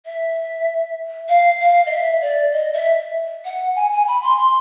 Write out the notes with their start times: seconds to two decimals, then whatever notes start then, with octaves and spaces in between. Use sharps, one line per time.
0.06 E5
1.29 F5
1.60 F5
1.86 D#5
1.91 E5
2.22 D5
2.52 D#5
2.73 E5
3.45 F#5
3.76 G#5
3.92 G#5
4.07 B5
4.22 C6
4.38 C6